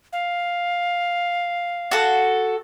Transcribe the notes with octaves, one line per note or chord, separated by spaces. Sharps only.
F5
F#4 A4